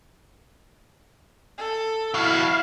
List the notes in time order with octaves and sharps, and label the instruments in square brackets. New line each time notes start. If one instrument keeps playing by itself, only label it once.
[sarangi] A4
[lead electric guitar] F2 F#4 [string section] E4 [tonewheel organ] F5